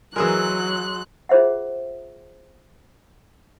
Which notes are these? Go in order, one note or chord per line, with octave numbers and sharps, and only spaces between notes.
E3 F#3 G#3 G#4 A#4 E6 F#6
F4 G#4 C5 E5 F#5